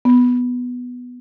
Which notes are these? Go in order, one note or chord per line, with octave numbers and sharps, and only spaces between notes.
B3